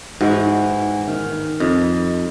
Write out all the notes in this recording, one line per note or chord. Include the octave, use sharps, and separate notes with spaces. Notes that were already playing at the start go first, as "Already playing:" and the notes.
G#2 E3 D#4 F#4
D#3
F2 D#4